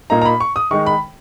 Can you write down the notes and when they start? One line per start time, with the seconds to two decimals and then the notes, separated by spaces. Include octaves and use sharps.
0.10 A#2 A#3 D#4 A#5
0.22 A#5
0.26 B5
0.40 C#6
0.56 D#6
0.71 D#3 G#3 D#4 C#6
0.86 B5